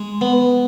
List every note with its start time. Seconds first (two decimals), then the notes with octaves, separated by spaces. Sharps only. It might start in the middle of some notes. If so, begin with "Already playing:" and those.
Already playing: G#3
0.21 B3